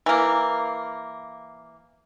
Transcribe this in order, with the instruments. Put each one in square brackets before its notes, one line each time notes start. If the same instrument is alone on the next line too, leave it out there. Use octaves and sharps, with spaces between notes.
[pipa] E3 A#3